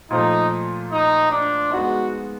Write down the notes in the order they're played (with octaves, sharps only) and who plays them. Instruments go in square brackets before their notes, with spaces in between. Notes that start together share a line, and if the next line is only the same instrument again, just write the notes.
[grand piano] A#2 F3 A3 [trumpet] D#4
[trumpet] D#4
D4
[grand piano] G#3 B3 D#4 [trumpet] F#4